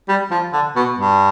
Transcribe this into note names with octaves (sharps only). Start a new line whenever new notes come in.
G3
F3
D3
B2
G2